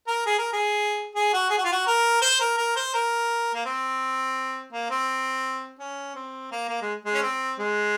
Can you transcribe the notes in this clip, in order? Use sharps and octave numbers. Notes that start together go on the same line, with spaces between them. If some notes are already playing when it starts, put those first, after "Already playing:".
A#4
G#4
A#4
G#4
G#4
F#4
G#4
F#4
F4
F#4
A#4
C5
A#4
A#4
C5
A#4
A#3
C4
A#3
C4
C#4
C4
A#3
A#3
G#3
G#3
C#4
C4
G#3